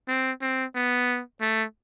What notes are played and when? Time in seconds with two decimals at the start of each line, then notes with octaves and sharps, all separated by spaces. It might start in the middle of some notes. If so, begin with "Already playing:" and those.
0.08 C4
0.41 C4
0.75 B3
1.41 A3